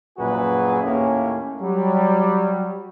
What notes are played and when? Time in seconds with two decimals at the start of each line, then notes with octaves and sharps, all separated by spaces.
0.18 A#1 F#2 A#2 F#4 G#4 B4
0.83 D#2 A2 A#3 C#4
1.61 F#3 G3